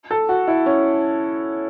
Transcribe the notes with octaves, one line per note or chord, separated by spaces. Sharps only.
A4
F#4
E4
C#4